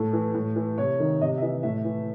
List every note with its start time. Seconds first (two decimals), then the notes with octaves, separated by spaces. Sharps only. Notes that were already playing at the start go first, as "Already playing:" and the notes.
Already playing: A2 A4
0.13 E3
0.34 A2
0.56 E3
0.78 C3 C#5
1.00 D#3
1.21 C3 D#5
1.37 E5
1.42 E3 D#5
1.63 A2 E5
1.84 E3